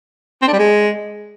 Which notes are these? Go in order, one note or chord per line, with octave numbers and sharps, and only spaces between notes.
C4
D4
G3
G#3